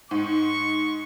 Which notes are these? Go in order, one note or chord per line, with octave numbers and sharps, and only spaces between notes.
G#2 C#6